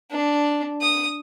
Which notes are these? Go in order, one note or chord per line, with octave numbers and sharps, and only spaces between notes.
D4
D#6